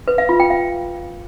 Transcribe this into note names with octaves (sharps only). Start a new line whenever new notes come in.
B4
F5
F4
G5
F5